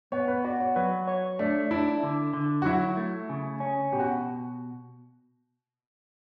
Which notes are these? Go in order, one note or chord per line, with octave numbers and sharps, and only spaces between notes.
B3 C#5
B4
F#4 D5
C#5
F#3 B4
C#5
A3 D4
D4 E4
D3
D3
F#4
F#3 E4
A3
C#3
C#4
B2 G4
F#4